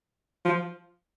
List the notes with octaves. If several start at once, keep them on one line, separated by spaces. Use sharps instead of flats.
F3